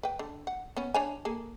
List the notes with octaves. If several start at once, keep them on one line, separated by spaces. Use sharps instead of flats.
B4 G5
D3
F#5
B3 C#4
D4 C#5 G#5
A#3 G#4 A4